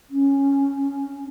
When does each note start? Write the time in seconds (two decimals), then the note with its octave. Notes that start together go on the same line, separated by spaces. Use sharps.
0.10 C#4